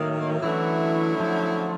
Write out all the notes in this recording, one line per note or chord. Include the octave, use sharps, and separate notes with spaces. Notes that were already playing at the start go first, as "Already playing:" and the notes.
Already playing: A2 D#3 F#3 A#3
D3 E3 F#3 A3 C#4 E4
F3